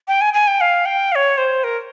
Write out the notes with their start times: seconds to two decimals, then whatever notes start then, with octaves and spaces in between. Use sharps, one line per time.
0.08 G5
0.21 G#5
0.34 G#5
0.48 G5
0.61 F5
0.86 G5
1.12 F5
1.15 C#5
1.38 C5
1.64 A#4